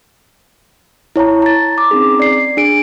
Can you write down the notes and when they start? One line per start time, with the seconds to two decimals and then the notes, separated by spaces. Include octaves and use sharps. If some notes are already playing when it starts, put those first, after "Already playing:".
1.16 E4 C#5 A5 A#5
1.42 A#5 A6
1.78 D6
1.91 C4 C#4 D#4 G#4
2.19 D5 C7
2.57 D4 G#4 D7